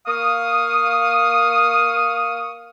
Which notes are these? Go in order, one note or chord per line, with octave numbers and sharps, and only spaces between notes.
A#3 F5 C#6 D#6